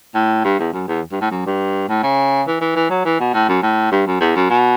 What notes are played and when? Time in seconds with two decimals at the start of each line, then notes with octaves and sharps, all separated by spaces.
0.15 A2
0.44 G2
0.59 E2
0.73 F#2
0.88 E2
1.12 G2
1.21 A2
1.31 F#2
1.46 G2
1.88 A2
2.03 C#3
2.47 E3
2.61 E3
2.75 E3
2.90 F#3
3.05 E3
3.20 B2
3.33 A2
3.48 F#2
3.63 A2
3.91 G2
4.07 F#2
4.20 E2
4.36 F#2
4.50 B2